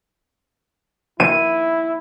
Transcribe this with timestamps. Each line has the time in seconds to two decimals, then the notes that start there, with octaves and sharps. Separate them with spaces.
1.20 E4 D#7